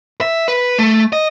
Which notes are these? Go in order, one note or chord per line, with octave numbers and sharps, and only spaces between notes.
E5
B4
A3
D#5